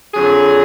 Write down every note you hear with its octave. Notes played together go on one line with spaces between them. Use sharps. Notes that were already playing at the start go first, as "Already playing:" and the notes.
F2 D3 F#3 G#4